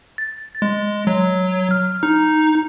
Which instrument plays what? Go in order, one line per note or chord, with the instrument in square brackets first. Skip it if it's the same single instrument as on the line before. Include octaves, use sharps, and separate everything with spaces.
[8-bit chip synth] A6
G#3
F#3
F6
D#4